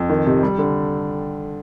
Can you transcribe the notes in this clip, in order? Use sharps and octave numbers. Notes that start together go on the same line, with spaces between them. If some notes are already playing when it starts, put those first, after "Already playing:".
Already playing: F2
D#3
C3
G3
D3